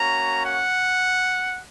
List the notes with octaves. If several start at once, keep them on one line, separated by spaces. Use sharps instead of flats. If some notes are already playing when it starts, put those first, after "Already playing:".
Already playing: A#3 C#4 F#4 A#5
F#5